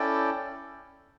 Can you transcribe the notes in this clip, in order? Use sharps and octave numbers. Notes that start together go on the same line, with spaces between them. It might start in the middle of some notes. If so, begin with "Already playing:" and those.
Already playing: C#4 E4 A4 D5 G5